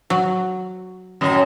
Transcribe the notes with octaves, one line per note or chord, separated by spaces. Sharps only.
F#3
F#2 A2 D#5